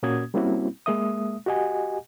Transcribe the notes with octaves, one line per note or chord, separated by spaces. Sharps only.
A#2 A#3 C#4 F#4 D#6 G#6
G3 A#3 C4 C#4 E4 F#4
G#3 A#3 E5 D#6
F#4 G4 D#5 F#5 G#5